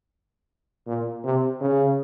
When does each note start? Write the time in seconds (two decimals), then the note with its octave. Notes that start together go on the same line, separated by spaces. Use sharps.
0.87 A#2
1.24 C3
1.60 C#3